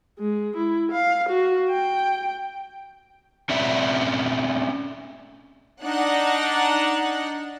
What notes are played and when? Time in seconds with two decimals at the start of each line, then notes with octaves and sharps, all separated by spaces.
0.18 G#3
0.57 E4
0.92 F5
1.29 F#4
1.70 G5
3.49 A3 C4 C#4 D5 E5
5.84 D4 D#4 F#5